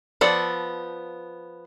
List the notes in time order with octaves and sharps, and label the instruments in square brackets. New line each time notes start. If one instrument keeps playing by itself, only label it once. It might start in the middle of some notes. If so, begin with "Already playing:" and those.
[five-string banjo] F3 B3 A4 D5